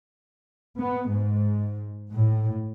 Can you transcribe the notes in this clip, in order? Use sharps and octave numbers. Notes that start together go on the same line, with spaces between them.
B3
G#2
A2